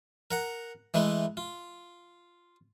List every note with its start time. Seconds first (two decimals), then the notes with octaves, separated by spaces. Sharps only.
0.31 A#4 F#5 A#5
0.94 E3 G#3 A3 B4
1.37 F4